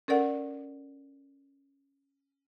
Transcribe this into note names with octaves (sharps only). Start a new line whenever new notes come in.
C#4 A4 A#4 D5 F#5